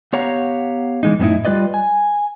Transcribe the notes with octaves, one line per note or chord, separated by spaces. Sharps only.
B3 G4 C#5 F5 F#5 A#5
E3 G#3 D#4
F#2 A2 B3 C#4 D#4 E4
G3 F4 B4 D5 D#5
G#5